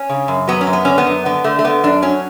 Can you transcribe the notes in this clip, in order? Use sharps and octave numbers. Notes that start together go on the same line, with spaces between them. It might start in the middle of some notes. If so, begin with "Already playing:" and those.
Already playing: C#4
C#3
F#2
F#3 B3
C#4
F#2
B3
D3 C#4
B3
F#2
D3 B3
D3 A3
A3
D3 B3
F#2 D4
F#3 C#4